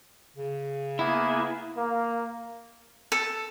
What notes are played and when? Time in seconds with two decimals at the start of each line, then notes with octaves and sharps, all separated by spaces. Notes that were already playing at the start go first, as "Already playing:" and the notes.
0.36 C#3
0.99 A#3 B3 E4 G#4
1.77 A#3
3.12 A4